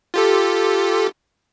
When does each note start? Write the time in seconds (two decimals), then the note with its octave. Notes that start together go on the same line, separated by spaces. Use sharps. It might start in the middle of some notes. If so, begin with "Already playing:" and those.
0.14 F4 G4 A4